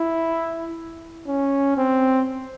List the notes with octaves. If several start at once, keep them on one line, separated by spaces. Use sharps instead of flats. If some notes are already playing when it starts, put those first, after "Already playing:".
Already playing: E4
C#4
C4